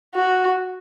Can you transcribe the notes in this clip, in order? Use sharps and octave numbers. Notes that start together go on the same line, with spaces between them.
F#4